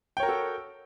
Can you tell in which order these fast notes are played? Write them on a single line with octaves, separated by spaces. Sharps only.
G5 C#5 A#4 F#4 A4